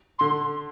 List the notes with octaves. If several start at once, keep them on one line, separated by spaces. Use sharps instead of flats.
D3 C6